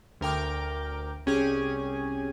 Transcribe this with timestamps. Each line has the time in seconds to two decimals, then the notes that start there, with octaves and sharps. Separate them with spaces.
0.21 D2 A#4 G5 D6
1.26 C2 C#4 G4 G#4 G#5